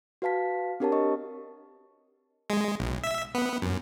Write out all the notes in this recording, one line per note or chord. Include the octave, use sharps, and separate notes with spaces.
F#4 B4 F5 A5 B6
C4 D4 G4 A#4 C#5 A5
G4 D#5 C#6
G#3
B1
E5
B3
F#2